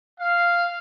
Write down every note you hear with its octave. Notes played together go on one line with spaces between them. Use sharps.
F5